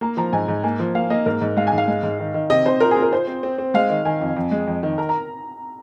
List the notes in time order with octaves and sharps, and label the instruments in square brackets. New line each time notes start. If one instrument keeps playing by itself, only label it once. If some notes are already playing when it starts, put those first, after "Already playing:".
[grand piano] A#3 [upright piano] A#5
[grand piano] F3 [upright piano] A#5
[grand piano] G#2 [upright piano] G#5
[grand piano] G#2
[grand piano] A#3 [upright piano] G#5
[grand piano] F3
[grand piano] A#3 [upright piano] F5
[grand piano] A#3 [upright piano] D#5
[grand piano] G#2 [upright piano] A#4
[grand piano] G#2
[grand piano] G#3 [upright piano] F5
[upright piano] G#5
[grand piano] G#2 [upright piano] F5
[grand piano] G#3
G#2
D#3
D#3
[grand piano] C3 [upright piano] D#5
[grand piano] C3 [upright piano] C5
[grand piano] F4 [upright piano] A#4
[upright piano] G#4
[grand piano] F4
[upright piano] A#4
[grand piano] F4 [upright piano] C5
[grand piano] C4
C4
C4
[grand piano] G#3 [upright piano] F5
[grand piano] D#3
[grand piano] D#3 [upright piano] G#5
[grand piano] F2
F2
G#3
F2
D#3
[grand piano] A#4 [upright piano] A#5
[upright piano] A#5